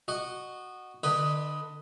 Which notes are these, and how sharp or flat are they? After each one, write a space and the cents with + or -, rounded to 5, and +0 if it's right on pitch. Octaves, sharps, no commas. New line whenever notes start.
F#4 +0 D#5 -25
D3 +35 B4 -5 D#5 +10